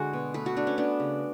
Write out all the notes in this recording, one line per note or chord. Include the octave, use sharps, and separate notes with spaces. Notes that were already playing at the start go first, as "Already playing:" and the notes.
Already playing: D3 G#3 F#4 G#4
B2
A3 B4
F#4
A3 D4
C#4
B3 D4
C#3